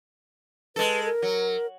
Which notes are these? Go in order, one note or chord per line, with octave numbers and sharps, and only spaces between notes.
G#3 A4 B4
A#4
F#3